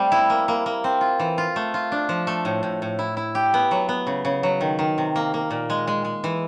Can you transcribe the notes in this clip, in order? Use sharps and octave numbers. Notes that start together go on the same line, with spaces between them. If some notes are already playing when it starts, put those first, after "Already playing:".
Already playing: G3 A3 C4
E4
A#3
A#3
A#3
C4
F4
E3
F4
A3
F4
D4
F3
A3
A2
A2
A2
E4
E4
G4
B3
F#3
B3
C#3
C#3
F#3
D#3
D#3
C3
A#3
A#3
A#2
G#3
G#3
G#3
E3